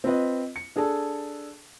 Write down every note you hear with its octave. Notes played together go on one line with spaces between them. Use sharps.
C4 F4 B4 D#5
C#7
D4 G#4 A4 A5